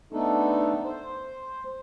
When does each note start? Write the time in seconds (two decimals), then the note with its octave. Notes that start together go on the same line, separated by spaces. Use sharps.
0.13 A3 B3 D4 D#4 A4
0.84 C5